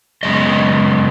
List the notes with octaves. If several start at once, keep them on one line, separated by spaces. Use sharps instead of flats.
F#2 C#3 G#3 B3 D#5